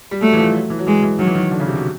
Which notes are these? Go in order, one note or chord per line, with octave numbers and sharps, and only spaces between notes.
G3
F#3 A3
E3
F3
F#3
E3
F#3
E3 G#3
E3
D#3 F#3
E3
D#3
D3
C#3
C3
B2